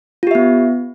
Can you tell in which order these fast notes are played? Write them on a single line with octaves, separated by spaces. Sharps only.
F4 G4 E5 B3